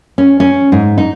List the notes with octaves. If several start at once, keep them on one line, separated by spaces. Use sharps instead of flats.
C#4
C#4
G#2
D#4